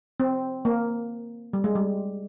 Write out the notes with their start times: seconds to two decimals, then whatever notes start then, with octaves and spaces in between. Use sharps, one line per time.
0.20 C4
0.65 A#3
1.53 G3
1.64 G#3
1.75 G3